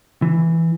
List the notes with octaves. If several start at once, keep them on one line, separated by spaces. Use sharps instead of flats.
E3